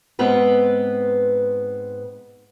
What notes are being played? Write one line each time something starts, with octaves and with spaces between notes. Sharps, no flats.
G#2 B3 C4 B4